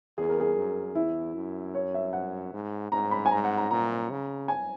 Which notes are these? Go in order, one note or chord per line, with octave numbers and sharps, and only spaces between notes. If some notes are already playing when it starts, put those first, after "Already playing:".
E2 G#4
A#4
G#4
F#2
E2 E4
F#2
C#5
E5
F#5
G#2
G#2 A#5
B5
G#5
G#2 A#5
F#5
A#5
A#2 A#5
C#3
G#5